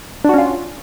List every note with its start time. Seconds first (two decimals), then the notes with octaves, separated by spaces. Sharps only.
0.24 D4
0.29 F#4
0.34 C#4
0.38 F4